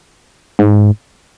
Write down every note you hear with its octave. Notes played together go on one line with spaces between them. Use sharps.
G#2